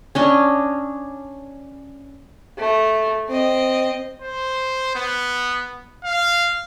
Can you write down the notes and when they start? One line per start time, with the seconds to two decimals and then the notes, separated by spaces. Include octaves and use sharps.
0.15 C#4 D4 D#5
2.58 A3
3.29 C4 D#5
4.22 C5
4.95 B3
6.04 F5